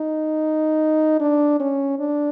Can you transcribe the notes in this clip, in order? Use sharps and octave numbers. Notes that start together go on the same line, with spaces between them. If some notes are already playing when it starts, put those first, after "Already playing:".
Already playing: D#4
D4
C#4
D4